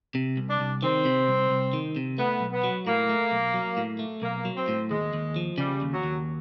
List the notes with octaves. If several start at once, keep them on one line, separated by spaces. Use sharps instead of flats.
C3
C2
D4
C2
D#3 C4
C3
C2
C2
D#3
C3
A3 B3
B1
B3
F#3
A2 A#3
A3
B1
F#3
A2
A3
B1 A#3
F#3
C4
A2
D#2 G#3
D#2
F3
C#3 G3
D#2
F#3
D#2